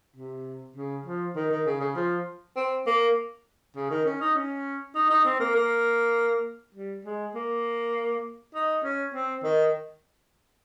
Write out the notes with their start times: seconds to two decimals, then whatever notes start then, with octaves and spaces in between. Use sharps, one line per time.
0.16 C3
0.76 C#3
1.06 F3
1.36 D#3
1.51 D#3
1.66 C#3
1.80 C#3
1.95 F3
2.56 C4
2.86 A#3
3.76 C#3
3.90 D#3
4.06 C#4
4.21 D#4
4.35 C#4
4.95 D#4
5.10 D#4
5.25 C4
5.40 A#3
5.55 A#3
6.75 G3
7.05 G#3
7.35 A#3
8.54 D#4
8.84 C#4
9.14 C4
9.44 D#3